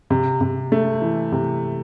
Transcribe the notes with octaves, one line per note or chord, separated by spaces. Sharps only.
C3
C3
A3
E3
C3